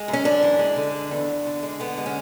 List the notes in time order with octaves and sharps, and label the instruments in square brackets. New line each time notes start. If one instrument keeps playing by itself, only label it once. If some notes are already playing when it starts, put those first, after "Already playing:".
Already playing: [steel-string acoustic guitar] G#3
F#2
C#4
F#2 D4
E3
G#3
D3
G#3
E2
E2
D3
G#3
D3 B3
G#3
C#4